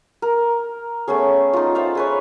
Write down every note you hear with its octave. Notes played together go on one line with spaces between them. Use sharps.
A#4
A3 B3 C#4 G#4
D#4 F4
C5 D5 E5 F5
G#4 B4 C#5